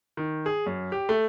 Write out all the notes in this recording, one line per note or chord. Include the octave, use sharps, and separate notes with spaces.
D#3
G#4
F#2
G4
A3